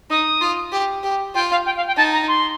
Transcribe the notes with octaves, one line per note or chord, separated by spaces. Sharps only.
D#4 D#6
F4
G4
G4
F4 G5
F5
G5
F5
G5
D#4 A5
A#5
C6